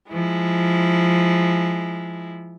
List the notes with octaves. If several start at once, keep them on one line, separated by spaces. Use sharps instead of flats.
F3 G#3 E4